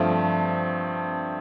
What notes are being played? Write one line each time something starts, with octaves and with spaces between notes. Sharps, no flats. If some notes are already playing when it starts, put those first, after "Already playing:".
Already playing: G2 F3 A3 C4